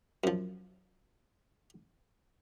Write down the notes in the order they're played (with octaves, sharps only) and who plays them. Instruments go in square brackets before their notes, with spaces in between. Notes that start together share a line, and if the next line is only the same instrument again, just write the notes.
[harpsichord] F#2 F3